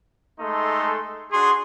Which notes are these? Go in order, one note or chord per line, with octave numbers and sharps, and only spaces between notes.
G#3 A3 D#4 A4 C6
D4 F#4 G#4 C6